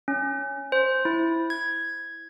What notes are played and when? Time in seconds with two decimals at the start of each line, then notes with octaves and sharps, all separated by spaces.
0.08 C#4
0.72 C5
1.05 E4
1.50 G#6